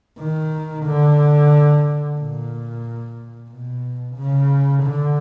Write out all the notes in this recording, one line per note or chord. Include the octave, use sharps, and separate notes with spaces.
D#3
D3
A#2
B2
C#3
D3